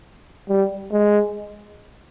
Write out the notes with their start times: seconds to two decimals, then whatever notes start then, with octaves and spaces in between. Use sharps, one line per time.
0.49 G3
0.92 G#3